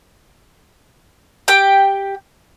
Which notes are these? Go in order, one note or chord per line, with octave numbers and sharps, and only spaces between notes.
G4 G5